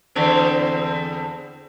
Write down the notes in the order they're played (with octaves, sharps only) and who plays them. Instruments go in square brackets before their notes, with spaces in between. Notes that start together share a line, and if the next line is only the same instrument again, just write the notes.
[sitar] E2 D3 C4